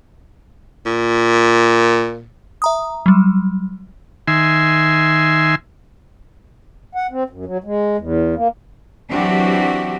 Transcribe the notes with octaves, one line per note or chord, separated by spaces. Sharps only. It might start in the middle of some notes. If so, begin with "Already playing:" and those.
A#2
E5 A#5 D#6
F#3 G3
D#3 E5 G#5 C6
F#5
C4
F#2
F#3
G#3
E2
A#3
E3 F#3 C4 D4 F#4 G4